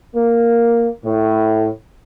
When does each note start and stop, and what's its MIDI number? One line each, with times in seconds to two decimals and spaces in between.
0.16 0.88 58
1.04 1.69 45